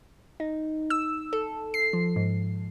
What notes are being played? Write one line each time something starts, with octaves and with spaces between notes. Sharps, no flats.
D#4
E6
A4
C7
F3
G#2